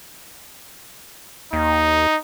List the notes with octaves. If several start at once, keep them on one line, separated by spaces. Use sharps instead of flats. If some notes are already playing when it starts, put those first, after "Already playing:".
D#2 D#4